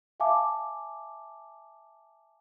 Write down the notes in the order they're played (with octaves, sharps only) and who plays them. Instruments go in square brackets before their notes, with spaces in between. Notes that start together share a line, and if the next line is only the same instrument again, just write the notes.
[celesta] E5 F5 G#5 A5 D6